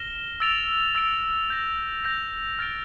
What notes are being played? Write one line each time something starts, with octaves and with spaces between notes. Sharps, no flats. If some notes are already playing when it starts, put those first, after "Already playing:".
Already playing: F6 A#6 E7 G7
E6 A6 D7 F7
E6 A6 D7 F7
G6 A#6 F7
G6 A#6 F7
F6 A6 D7